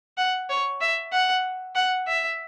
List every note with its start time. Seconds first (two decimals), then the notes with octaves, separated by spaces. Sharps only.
0.17 F#5
0.50 C#5
0.81 E5
1.12 F#5
1.75 F#5
2.07 E5